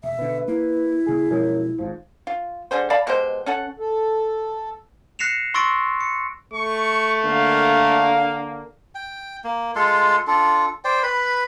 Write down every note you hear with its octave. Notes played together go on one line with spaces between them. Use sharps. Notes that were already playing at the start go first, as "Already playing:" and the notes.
E1 E5
B2 D3 B4
A#3 E4
D1 C#3 A#3 G#4
F#2 B2 F3 G#3
G#1 G#2 F3
F4
D3 G3 G#4 C5
D5 F5 A5 B5
B2 G#3 G4 C5
C#4 A4 F#5
A4
F#6 A#6 C7 C#7 E7 F7
C6 C#6 E6 A6 A#6 D7
C#7
A3 C#6
D3 A#3 F5
G5
A#3
G#3 F4 A4 C6
D4 F4 A4
C5 D5 G5
B4 B5